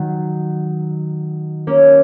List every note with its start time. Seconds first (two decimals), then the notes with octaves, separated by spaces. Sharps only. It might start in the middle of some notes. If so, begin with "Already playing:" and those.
Already playing: D#3 F#3
1.67 A#3 C#4